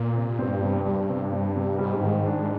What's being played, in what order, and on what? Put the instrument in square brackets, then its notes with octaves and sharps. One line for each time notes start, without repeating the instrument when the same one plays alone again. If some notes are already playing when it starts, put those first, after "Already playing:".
Already playing: [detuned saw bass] A#2
[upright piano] C3
[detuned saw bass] G2 [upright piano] C4
[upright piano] C3
[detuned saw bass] G2 [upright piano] G3
[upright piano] C3
C4
C3
[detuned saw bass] G#2 [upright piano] G3
[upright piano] D#3
D4